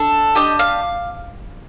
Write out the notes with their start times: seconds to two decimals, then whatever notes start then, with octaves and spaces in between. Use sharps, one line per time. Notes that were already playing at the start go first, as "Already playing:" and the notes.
Already playing: D4 A4
0.35 D4 G4 D#5
0.59 F5